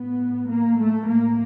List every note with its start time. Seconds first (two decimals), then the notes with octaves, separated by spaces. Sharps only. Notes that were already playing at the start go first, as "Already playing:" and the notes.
Already playing: A2 B3
0.49 A#3
0.78 A3
1.07 A2 A#3